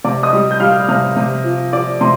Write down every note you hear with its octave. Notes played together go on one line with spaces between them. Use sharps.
C3 D5 D6
D#5 D#6
G3
G6
G3 F5 F6
C3 F5 F6
C3
F3
F3 D5 D6
C3 C6